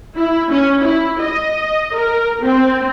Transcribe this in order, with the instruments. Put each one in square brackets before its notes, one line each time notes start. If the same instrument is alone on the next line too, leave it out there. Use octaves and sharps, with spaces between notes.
[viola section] E4
C#4
E4
D#5
A#4
C4